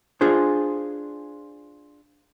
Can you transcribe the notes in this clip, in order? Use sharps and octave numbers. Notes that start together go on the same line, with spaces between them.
D4 F4 G#4 C5